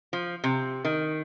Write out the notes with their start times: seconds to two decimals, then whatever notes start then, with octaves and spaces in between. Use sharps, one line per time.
0.13 F3
0.44 C3
0.85 D#3